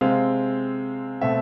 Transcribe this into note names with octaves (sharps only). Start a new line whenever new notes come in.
C3 G#3 C4 F5
B2 A3 C4 E5